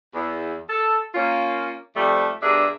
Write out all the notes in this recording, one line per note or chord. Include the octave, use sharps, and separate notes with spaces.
E2
A4
A#3 C#4 F4
F2 F3 G3 A3
G2 B2 D4 G#4 A#4 E5